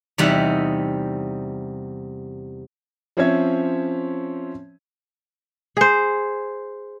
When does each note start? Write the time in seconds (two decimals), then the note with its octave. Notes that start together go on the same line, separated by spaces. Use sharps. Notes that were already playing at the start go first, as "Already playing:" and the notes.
0.18 E2 C3 G3 D#4 E5 F#5
3.17 F3 C4 C#4 C#5 E5 G#6
5.77 G#4 C5